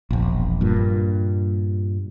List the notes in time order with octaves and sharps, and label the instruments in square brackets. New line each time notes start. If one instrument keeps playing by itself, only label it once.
[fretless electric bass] E1 A#1
G2 A#2